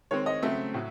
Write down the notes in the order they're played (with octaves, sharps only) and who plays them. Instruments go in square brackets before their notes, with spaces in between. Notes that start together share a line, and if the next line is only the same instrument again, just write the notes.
[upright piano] D#3 G#3 C4 C#5
D#5
C#3 F#3 A3 C4 E5
A2 F#3